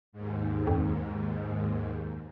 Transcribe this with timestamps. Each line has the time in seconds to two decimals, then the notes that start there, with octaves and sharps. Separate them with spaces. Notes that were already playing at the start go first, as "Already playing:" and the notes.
0.12 D#2 G#2
0.67 F2